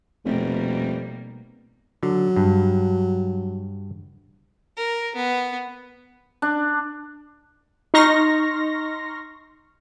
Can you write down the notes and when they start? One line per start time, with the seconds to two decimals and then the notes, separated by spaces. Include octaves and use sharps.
0.25 F1 B2 G3 A#3
2.03 D3 F#3
2.36 G2
4.77 A#4
5.15 B3
6.42 D4
7.94 D#4 C6 C#6 F6 A#6